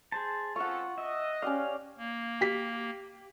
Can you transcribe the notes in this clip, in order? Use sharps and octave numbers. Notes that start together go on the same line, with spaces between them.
G#4 C5 A5
C4 C#4 F4 A4 F#5 C#6
D#5 E5
C#4 G4 D5 F5
A#3
G4 B6